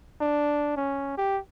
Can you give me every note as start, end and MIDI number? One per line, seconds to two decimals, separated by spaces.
0.20 0.73 62
0.76 1.16 61
1.17 1.38 67